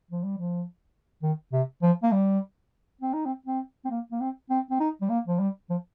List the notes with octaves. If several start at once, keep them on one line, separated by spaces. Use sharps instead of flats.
F3
G3
F3
D#3
C3
F3
A#3
G3
C4
D#4
C4
C4
C4
A#3
A#3
C4
C4
C4
D#4
G3
A#3
F3
G3
F3